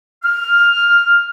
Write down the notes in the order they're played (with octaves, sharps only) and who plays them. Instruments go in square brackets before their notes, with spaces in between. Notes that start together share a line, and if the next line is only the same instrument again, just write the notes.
[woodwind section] F6